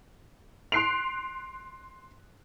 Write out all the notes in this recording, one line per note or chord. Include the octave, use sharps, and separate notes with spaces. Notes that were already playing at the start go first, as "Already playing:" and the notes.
C6 F#6 C7 D7 F7